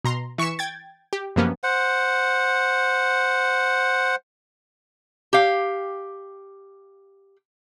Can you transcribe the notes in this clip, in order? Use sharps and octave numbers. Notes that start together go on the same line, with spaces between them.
B2 A#5 C6
E3 C#6 B6 C#7 E7
G5 G#6 A6
G4
F#2 C3 F3 A#3 B3 C#4
C5 F#5
G4 F5